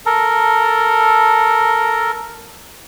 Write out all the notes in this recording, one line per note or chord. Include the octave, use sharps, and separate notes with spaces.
A4 A#4